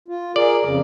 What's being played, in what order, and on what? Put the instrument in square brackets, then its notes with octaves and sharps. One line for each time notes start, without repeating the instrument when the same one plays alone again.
[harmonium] F4
[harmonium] G#4 A#4 [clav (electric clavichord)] D5
[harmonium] F2 C#3